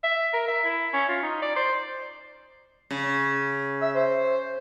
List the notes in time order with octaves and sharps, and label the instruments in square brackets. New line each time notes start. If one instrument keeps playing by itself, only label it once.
[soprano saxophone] E5
A#4
E5
E4
C#4
F4
D#4
D5
C5
[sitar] C#3
[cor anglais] E5
C5